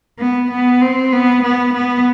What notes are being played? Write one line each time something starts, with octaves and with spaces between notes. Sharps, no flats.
B3
B3
C4
B3
B3
B3